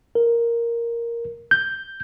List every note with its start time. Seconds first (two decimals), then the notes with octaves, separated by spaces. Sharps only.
0.15 A#4
1.51 G6